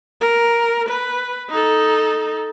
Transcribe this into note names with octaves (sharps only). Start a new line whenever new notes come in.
A#4
B4
D#4 A4